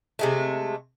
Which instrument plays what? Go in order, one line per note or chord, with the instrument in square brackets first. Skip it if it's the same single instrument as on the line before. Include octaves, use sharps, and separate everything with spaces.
[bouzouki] C3 G#3 A3